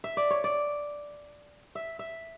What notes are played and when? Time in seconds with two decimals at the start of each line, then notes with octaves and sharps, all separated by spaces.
0.04 E5
0.17 D5
0.31 C#5
0.44 D5
1.75 E5
1.99 E5